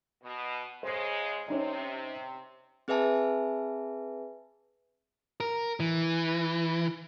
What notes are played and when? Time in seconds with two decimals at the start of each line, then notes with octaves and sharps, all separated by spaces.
0.23 B2
0.83 C#3 G#3 C5 C7
1.48 C3 C#4 D#4 D5
2.88 C4 G#4 B4 E5 G#5 A5
5.40 A#4
5.80 E3